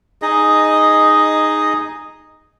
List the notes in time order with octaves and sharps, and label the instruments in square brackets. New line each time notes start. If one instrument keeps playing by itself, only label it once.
[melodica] D#4 G#4 D#5